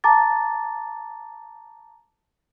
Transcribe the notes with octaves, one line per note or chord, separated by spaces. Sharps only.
A5 A#5 D6 A6